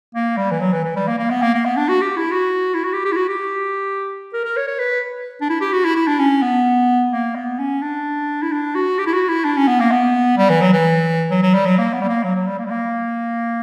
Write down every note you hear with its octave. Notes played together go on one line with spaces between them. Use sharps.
A#3
G3
E3
F#3
E3
E3
G3
A#3
A#3
B3
A#3
A#3
B3
D4
F#4
G4
E4
F#4
E4
F#4
G4
G4
E4
F#4
G4
A#4
A#4
C#5
C#5
B4
D4
E4
G4
F#4
E4
E4
D4
C#4
B3
A#3
B3
C#4
D4
E4
D4
F#4
G4
E4
F#4
E4
D4
C#4
B3
A#3
B3
G3
E3
F#3
E3
F#3
F#3
G3
F#3
A#3
B3
G3
A#3
F#3
F#3
G3
A#3
G3
A#3